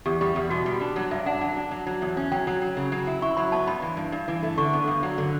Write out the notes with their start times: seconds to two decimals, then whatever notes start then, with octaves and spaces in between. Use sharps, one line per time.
0.06 E2 G4
0.21 G3 G4
0.36 E2 G4
0.50 B2 F#4
0.66 G3
0.81 D4
0.96 F#3
1.11 G2 E5
1.26 D4 F#5
1.41 F#3 F#5
1.56 D4
1.71 F#3
1.87 F#3
2.02 E2
2.17 C#4
2.32 F#3 G5
2.47 F#3
2.62 F#3
2.77 C#3
2.92 F#3
3.07 E4
3.22 E4 C#6
3.36 F#3 B5
3.52 B3 A5
3.67 G2 B5
3.82 E3
3.97 G2
4.12 G2
4.28 E3
4.43 A3
4.58 D3 C#6
4.73 B3
4.87 G2
5.03 F#3
5.18 D3